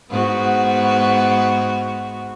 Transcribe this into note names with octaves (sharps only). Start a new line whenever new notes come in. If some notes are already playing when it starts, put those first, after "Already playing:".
G#2 B3 F#4